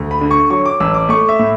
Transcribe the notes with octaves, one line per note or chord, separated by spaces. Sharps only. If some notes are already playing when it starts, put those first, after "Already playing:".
Already playing: D2
B5
D3
C#6
F#3 C#6
D6
A1 E6
D6
A3 C#6
E5
A2